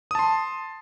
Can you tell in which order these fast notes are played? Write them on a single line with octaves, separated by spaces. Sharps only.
D#6 A5 C6